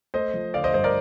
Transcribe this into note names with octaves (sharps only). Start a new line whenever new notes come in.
A3 C5 D#5
F3
D3 D5 F5
C5 D#5
G2 C5 D#5
A#4 D5